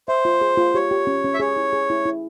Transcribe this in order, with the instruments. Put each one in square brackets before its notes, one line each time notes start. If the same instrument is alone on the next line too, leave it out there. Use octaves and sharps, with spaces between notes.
[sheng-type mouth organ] C5 [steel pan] E5
[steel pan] F4
G#4
F4
[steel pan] G4 [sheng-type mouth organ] C#5
[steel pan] G4
C#4
C#4
[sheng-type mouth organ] E5
[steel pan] G#4 [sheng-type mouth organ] C#5
[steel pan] E4
G#4
E4
E4